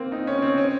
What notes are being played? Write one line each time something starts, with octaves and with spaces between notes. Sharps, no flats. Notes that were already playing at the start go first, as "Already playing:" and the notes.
Already playing: A#3 C4
D#4
C#4
C4
C#4